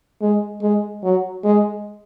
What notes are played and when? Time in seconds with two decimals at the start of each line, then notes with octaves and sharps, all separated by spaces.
0.22 G#3
0.62 G#3
1.03 F#3
1.45 G#3